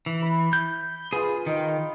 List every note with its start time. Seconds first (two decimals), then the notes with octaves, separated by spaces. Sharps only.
0.06 E3
0.22 B5
0.53 G6
1.13 B3 F4 G#4
1.46 D#3 D#5 F5 G5